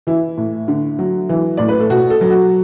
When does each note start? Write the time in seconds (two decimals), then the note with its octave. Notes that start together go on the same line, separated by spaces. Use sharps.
0.07 E3 E4
0.38 A2
0.68 D3
0.99 F#3
1.29 E3
1.57 A2 D5
1.69 B4
1.79 A4
1.90 B2 F#4
2.10 A4
2.21 F#3
2.30 F#4